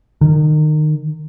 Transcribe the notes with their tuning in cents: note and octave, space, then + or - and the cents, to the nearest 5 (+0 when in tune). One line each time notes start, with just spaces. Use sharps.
D#3 -30